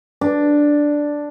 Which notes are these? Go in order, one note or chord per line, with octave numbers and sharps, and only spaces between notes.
D4